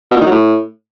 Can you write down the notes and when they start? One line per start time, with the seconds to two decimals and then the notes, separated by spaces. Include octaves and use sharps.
0.11 B2
0.16 A#2
0.21 D#3
0.26 F#3
0.31 A2